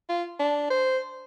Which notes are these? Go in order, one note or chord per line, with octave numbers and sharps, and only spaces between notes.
F4
D4
C5